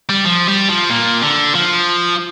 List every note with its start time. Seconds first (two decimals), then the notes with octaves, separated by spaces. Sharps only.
0.09 G3
0.25 F3
0.48 G3
0.69 F3
0.90 A#2
1.23 D3
1.55 F3